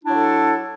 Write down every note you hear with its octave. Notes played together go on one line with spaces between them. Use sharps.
F#3 D4 E4 A4